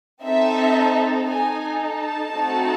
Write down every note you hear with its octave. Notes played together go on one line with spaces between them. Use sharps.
C4 D#4 A4 E5
D#4 A4 G#5
A5
A3 C4 D#4 F#4 A4